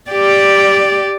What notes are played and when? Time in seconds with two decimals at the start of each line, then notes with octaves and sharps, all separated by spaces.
0.10 G4 D5